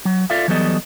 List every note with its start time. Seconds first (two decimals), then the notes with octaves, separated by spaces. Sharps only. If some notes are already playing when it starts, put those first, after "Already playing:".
0.05 F#3
0.30 F4 A4 D5 E5 F5
0.48 E3 F#3 G3 B3 A4 D#5